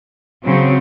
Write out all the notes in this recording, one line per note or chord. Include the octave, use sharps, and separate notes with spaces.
C#3 F#3 C4